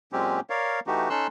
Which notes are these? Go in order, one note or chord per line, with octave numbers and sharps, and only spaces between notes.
A#2 F#3 G#3 C4 C#4 G4
A#4 C#5 D5 F5
E3 A3 D#4 F#4 G4
C#4 D#4 A4 C6 E6 F#6